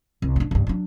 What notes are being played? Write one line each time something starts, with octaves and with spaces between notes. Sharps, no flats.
C2
E3 D4
C#2 G2
F#3 D4